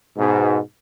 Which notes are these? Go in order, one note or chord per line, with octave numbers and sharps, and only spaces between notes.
G#2 B2